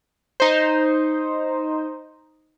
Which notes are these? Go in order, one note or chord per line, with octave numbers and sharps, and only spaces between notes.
D#4 C5